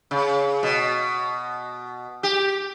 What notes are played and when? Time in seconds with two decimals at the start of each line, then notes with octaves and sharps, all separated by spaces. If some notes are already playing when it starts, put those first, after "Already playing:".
0.11 C#3
0.63 B2
2.23 G4